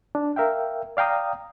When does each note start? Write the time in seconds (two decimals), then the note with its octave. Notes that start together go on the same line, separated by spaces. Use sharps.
0.15 D4
0.36 A#4 E5 F5 G5
0.97 D5 F5 G5 A#5 D#6